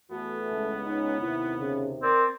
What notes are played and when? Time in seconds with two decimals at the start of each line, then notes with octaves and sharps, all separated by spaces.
0.11 E2 E3 A3 B3 F#4
0.53 C#2
0.85 C#4 D#4
1.21 D#2 C3 E4
1.60 C#3
2.03 C4 A#4 D5